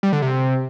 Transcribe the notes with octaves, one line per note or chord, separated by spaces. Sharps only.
G3
D3
C3